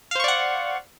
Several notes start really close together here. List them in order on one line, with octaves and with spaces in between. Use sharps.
F5 C5 C#6 D5 F#5